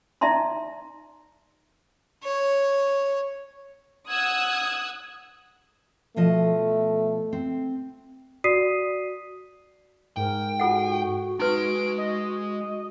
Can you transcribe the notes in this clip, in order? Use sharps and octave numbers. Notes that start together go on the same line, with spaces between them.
D#4 D5 E5 A5 A#5 C6
C#5
F#5 D#6 E6 F#6 G#6
B2 F3 A3 D#5
C4
F#4 D5 D#6 B6 C7 D#7
G#2 A#4 G5
F4 F#4 A4 F#5
G#3 D#4 B4 C6 D7
D#5